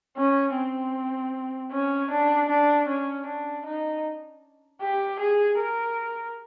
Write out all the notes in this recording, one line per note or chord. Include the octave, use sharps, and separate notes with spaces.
C#4
C4
C#4
D4
D4
C#4
D4
D#4
G4
G#4
A#4